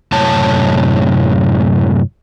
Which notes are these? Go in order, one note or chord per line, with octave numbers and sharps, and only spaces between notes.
F#2 A2 C3 C#5 A5